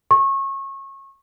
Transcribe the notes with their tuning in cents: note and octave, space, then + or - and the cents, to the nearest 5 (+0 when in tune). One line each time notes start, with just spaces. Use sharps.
C#6 -25